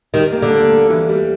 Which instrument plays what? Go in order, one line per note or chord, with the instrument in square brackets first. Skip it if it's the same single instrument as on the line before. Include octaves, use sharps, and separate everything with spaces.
[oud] D#3 [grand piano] G3
[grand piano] A#3
[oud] D3
[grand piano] A#3
A#3
E3
G3